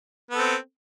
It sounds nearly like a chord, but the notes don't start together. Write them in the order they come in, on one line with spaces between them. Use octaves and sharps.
B3 A4 C4